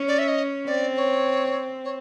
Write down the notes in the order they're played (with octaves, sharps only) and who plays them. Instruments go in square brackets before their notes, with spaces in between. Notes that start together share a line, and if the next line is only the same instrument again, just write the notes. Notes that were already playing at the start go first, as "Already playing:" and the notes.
Already playing: [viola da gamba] C#4
[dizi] D5
E5
D#5
[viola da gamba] C4 [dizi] D5
[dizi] C#5
C#5